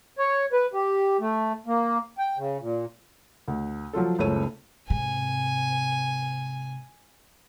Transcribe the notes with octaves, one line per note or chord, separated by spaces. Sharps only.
C#5
B4
G4
A3
A#3
G5
C#3
A#2
D2
F3 F#3 F4 A4
F#1 C#2 C#3 A3 C#5 D#7
G#2 C3 G#5